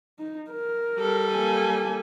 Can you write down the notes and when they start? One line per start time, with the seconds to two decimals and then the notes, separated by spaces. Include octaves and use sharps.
0.19 D#4
0.50 A#4
0.99 G3 A4
1.31 A#3 G#5